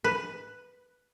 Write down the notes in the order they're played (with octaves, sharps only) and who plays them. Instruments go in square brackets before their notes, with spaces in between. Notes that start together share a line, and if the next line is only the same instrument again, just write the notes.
[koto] B4